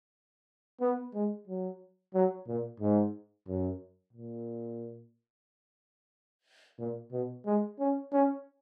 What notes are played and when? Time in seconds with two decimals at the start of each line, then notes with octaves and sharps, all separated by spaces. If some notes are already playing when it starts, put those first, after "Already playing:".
0.81 B3
1.14 G#3
1.47 F#3
2.14 F#3
2.47 A#2
2.80 G#2
3.48 F#2
4.13 A#2
6.79 A#2
7.12 B2
7.46 G#3
7.79 C#4
8.13 C#4